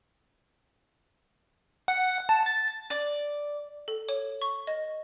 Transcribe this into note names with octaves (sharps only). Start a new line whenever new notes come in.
F#5
A5
A6
D5
A4
C#5
C#6
D#5